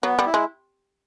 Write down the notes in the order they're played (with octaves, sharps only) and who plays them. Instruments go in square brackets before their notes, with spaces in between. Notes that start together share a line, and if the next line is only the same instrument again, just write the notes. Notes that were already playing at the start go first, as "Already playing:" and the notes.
[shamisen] F#3 [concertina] B3
[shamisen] G3
[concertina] E4
[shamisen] G#3